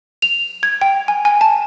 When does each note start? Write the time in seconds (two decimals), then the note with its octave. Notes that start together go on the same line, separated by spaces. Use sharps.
0.22 F7
0.63 G#6
0.81 G5
1.08 G#5
1.25 G#5
1.41 A5